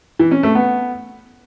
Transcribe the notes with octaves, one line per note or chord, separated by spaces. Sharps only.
E3
C#4
A3
B3